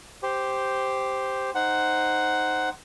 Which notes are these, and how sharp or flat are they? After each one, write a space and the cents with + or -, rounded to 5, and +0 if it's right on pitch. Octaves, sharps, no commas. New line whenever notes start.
G4 +0 C5 +0
D#4 +0 C5 +0 F#5 +10